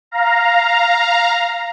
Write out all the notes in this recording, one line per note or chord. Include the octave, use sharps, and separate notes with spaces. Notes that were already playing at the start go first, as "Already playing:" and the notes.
F5 A#5